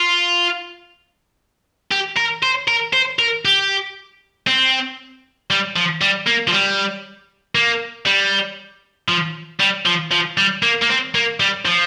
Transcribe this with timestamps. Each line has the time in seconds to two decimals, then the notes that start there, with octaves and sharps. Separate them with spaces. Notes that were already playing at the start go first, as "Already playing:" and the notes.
Already playing: F4
1.91 G4
2.17 A#4
2.43 C5
2.68 A#4
2.93 C5
3.19 A#4
3.45 G4
4.47 C4
5.50 G3
5.76 F3
6.01 G3
6.27 A#3
6.48 F3
6.52 G3
7.55 A#3
8.06 G3
9.08 F3
9.60 G3
9.86 F3
10.11 F3
10.38 G3
10.63 A#3
10.82 A#3
10.89 C4
11.15 A#3
11.40 G3
11.65 F3